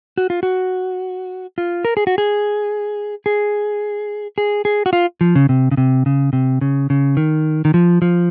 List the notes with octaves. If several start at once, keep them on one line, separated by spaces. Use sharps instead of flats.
F#4
F4
F#4
F4
A#4
G#4
F#4
G#4
G#4
G#4
G#4
F#4
F4
F3
C#3
C3
C#3
C3
C#3
C3
C#3
C#3
D#3
D#3
F3
F3